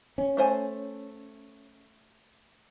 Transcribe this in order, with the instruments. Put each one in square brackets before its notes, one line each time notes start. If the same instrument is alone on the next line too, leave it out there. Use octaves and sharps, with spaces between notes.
[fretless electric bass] C#4
[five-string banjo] A3 C5 G#5